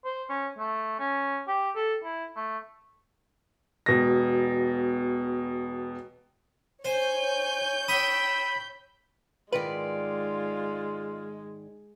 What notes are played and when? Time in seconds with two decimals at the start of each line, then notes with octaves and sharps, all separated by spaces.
0.05 C5
0.29 C#4
0.58 A3
0.99 C#4
1.48 G4
1.76 A4
2.04 E4
2.36 A3
3.86 E1 B2 A#6
6.85 C5 C#5 G#5 G6
7.88 G5 B5 C#6 D#6 E6
9.52 G#2 D#3 G#3 F4 B4 D5